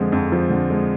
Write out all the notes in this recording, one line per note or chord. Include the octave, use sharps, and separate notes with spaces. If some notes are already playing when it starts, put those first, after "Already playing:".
Already playing: F2 D3 F3 G#3
F2
F3
D3
G#3